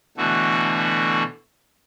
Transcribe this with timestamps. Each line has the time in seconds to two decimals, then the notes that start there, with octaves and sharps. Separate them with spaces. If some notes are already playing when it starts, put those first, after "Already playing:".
0.17 B2 D3 E3 A3 F#4